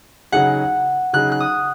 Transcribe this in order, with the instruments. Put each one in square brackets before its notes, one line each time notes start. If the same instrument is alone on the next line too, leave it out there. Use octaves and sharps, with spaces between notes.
[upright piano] C#3 F#3 D#4 G#4 [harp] F#5
[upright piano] C#3 F#3 D#4 G#4 [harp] F#6
[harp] F#6
D#6